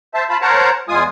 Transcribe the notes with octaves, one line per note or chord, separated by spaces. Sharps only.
C5 E5 A5
F4 A5 B5
A#4 C5 C#5 F#5 A5 A#5
E2 G#3 F4 G#5 D#6